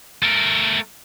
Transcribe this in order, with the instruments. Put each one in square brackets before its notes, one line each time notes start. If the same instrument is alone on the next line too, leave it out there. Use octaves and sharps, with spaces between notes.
[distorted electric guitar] A3 A#4